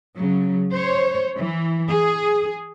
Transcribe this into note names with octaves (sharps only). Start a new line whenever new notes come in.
C#3 F#3
C5 C#5
E3
G#4